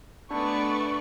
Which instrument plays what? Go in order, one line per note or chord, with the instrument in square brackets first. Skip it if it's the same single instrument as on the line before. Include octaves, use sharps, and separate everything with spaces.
[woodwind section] B2 G#3 B3 [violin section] A3 B4 D5 [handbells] D4 [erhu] C#6